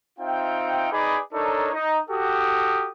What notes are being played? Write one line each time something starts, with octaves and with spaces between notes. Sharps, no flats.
C4 D#4 F4 E5 G5
D#4 G#4 B4 D5 B5 D6
D4 D#4 A4 A#4 C#5
D#4
F#4 G4 A4 D#6